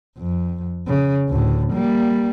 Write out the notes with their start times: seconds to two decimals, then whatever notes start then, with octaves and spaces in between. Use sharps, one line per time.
0.18 F2
0.87 C#3
1.28 D2 A2
1.73 G3 A#3